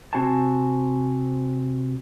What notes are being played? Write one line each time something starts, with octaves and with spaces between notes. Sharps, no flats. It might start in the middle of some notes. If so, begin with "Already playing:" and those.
C3 C4 F#4 C5 G#5 A5